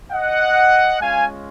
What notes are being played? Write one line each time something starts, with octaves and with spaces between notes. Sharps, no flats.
D#5 F#5
G#3 C#4 F4 F5 G#5